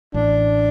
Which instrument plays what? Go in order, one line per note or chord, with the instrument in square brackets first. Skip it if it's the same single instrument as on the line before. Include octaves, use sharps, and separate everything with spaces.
[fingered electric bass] A1 A2 [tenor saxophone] D4